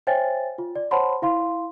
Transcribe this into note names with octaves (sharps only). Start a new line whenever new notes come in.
C5 C#5 E5 G5 G#5 A6
F4
D5
C5 C#5 F#5 A5 B5 C6
E4 F5 C6